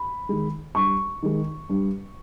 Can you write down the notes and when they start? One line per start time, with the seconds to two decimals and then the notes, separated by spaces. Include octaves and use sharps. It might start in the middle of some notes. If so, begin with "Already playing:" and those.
Already playing: B5
0.29 D#3 G#3
0.75 G2 C#6
1.23 D#3 G#3
1.69 G2